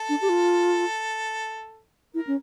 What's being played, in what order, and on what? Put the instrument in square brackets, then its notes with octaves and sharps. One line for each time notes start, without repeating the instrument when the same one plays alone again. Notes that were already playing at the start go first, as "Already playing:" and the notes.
Already playing: [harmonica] A4
[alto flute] D4
G4
F4
[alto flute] E4 [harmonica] A#4
[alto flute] C#4